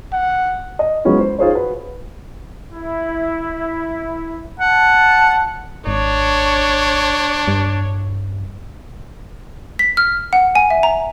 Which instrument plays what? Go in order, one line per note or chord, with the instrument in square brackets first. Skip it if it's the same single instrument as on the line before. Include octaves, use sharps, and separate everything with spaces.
[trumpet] F#5
[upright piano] D#5
F#3 G#3 B3 C#4 E4 F4
C5
D#4 F4 G#4 C5 C#5
F#4 B4
[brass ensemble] E4
[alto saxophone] F#5 [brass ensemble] A5
[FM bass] G#1 [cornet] D4 [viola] C#5
[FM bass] G2
[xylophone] B6
F6
F#5
G#5
E5
A#5